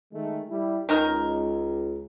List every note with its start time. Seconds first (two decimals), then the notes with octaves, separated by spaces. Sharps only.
0.12 D#3 G#3 A3
0.49 G3 E4
0.89 C#2 D#3 D#4 A#4